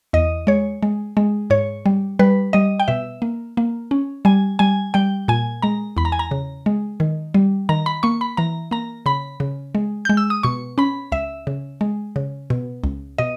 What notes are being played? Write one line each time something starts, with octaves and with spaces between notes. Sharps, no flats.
E2 D#5
G#3 C#5
G#3
G#3
G#2 C#5
G3
G3 B4
G3 D#5
G5
B2 E5
A#3
A#3
C#4
G3 G#5
G3 G#5
G3 G5
A#2 G#5
G#3 A#5
E2 B5
A#5
G#5
A#5
C#3
G#3
D#3
G3
D#3 A#5
B5
A#3 C#6
B5
E3 A#5
A#3 A#5
C#3 B5
C#3
G#3
G#3 G6
E6
D#6
B2 C#6
C#4 B5
C#2 E5
C#3
G#3
C#3
B2
C#2
B2 D#5